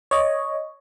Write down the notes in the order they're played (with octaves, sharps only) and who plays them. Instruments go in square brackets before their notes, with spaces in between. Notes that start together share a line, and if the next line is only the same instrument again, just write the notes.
[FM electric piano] C#5 D#5